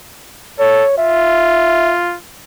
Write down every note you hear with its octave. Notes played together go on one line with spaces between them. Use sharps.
A4 C#5
F4 E5